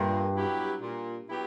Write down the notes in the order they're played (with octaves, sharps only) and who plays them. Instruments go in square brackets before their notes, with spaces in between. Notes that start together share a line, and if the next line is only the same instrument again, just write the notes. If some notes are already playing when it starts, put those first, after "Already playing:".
Already playing: [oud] G2 [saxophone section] A#2
[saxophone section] F#3 B3 E4 G4
A#2
F#3 B3 E4 G4